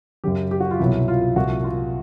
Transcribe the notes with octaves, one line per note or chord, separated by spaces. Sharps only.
F#2 C#3 F#3 G4
G4
F#4
F4
C2 B2 F#3 E4
F4
C2 A#2 F3 F#4
F4